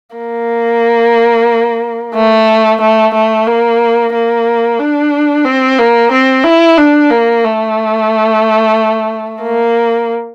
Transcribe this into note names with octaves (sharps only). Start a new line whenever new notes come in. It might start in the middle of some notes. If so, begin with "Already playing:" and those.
A#3
A3
A3
A3
A#3
A#3
D4
C4
A#3
C4
E4
D4
A#3
A3
A#3